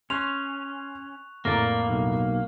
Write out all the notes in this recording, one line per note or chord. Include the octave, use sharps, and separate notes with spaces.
C#4 C6 C#6 F#6 F7
F2 A2 A#3 A#4 D5 A#5
B1